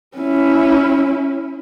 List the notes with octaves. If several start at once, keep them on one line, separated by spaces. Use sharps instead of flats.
C#4 E4